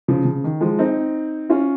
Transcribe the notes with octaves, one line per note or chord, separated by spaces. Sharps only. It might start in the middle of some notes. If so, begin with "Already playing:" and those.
C#3 F3
C#3
D#3
F3 G#3
C4 D#4
C#4 F4